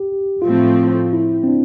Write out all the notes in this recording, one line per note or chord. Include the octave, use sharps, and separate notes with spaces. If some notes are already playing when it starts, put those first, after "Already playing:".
Already playing: G4
A2 F3 A3 C4 F4
E4
C4
D4